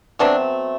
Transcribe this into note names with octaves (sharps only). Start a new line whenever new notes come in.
B2 F#3 A3 C4 D4